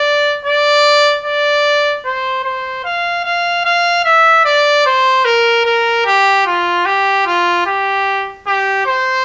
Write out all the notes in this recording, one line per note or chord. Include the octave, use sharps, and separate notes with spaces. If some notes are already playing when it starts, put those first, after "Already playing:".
Already playing: D5
D5
D5
C5
C5
F5
F5
F5
E5
D5
C5
A#4
A#4
G4
F4
G4
F4
G4
G4
C5